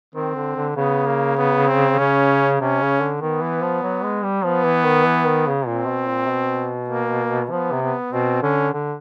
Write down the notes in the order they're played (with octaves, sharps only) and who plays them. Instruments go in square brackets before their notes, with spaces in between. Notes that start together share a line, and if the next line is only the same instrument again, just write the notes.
[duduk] D#3 [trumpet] C4
[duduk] D3
D3
[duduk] C#3 [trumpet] B3
[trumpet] A#3
B3
C4
[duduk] C#3 [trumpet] C#4
[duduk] C3 [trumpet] C#4
[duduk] C#3
D3
[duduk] D#3 [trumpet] B3
[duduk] E3
F3
F#3
G#3
G3
[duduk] F3 [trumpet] B3
[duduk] E3
D#3
E3
D#3
C#3
[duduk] A#2 [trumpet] C4
[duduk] B2
A#2
B2
[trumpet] A#3
[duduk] F3 [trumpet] B3
[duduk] C3
[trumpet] B3
[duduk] B2 [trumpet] C4
[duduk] D3 [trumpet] C#4
[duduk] D3